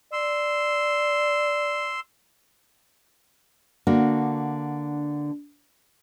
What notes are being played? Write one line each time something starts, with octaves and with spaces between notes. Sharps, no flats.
D5 C6 E6
D3 A#3 D4 F#4